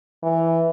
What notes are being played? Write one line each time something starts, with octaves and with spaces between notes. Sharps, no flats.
E3